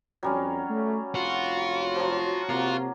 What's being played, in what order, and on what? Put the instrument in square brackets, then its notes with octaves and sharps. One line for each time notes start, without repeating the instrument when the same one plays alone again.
[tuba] F2 [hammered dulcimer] F#3 G3 C#4
[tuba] A3
[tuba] F1 [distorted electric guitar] F4 [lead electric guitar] F#4
[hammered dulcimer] F3 F#3
[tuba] C3 [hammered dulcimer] A#3 [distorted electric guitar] F4